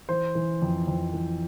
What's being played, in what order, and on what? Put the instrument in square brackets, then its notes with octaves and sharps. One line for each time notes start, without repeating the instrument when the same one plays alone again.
[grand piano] E3 C5
E3
F2
F2
E3